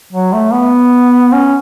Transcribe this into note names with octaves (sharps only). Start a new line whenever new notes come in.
F#3
A3
B3
C#4